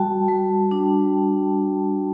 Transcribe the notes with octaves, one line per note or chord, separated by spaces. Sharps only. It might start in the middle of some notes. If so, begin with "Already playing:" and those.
Already playing: G3 F#4 G5 A5
G3
D4